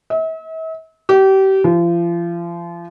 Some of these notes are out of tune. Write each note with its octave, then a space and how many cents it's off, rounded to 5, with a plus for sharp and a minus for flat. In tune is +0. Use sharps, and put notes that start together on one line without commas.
E5 -40
G4 -30
F3 -35